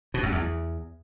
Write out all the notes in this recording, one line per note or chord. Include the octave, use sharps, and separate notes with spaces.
B2
F#2
E2